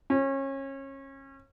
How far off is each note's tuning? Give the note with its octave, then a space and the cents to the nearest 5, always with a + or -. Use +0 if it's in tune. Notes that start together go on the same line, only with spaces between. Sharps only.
C#4 -30